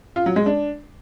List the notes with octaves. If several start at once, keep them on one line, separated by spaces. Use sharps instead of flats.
F4
F#3
G#3
D4